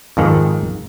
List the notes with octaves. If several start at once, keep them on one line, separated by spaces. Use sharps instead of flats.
F2 G#2 D#3